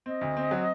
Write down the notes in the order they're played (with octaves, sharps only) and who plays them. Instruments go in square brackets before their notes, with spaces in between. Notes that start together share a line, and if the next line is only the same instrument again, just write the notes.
[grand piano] C4 [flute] D#5
[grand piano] D2
C4
F#3